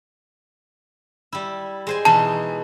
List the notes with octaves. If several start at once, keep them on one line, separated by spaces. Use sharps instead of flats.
G3 E4
G#3 C5 G#5
B2 E3 D#4 A5